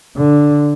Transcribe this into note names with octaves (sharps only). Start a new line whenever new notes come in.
D3